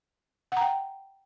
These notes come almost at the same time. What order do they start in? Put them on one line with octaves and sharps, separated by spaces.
F#5 A#5 G5